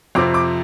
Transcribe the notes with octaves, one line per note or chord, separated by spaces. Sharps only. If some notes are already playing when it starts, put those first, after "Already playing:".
F2 C3 F3 C4 D6
D6